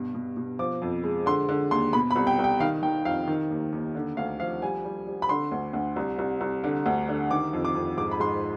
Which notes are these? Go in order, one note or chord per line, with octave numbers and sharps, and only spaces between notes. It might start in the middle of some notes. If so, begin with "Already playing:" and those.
Already playing: G2 B2
B2
B2
F3 D6
F2
G#3
D3 C6
D3
D#2 C6
B2 B5
B5
C2
G5
C2
G5
D#3 F5
D#3 G5
F2 F5
D#3
D#2
D#2
D3
D2 F5
F3 F5
G3 G#5
G3
G3
B5
D3 C6
D2
D2
C2
C2
C2
D3
D2
D3
D#3 D6
F2
D6
F2
G#2 D6
B5
G#2 C6